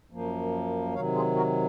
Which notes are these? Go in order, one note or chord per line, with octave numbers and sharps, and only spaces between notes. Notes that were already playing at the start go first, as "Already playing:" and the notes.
F#2 F3 A#3
C3 D#3 F#3 C#5 F5
F4 G#4
F#4 A#4